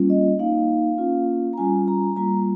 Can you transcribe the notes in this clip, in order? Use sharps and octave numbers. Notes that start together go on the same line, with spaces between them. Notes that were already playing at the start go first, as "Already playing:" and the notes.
Already playing: G3 A#3 C#4 F4
D#5
A#3 D#4 F5
A#3 C#4 F4
A#5
G3 C#4 F4 G#5
A#5
G3 A#3 F4 A#5